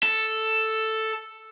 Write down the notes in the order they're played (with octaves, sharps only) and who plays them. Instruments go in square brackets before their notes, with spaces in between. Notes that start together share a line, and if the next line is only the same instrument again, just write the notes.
[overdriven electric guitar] A4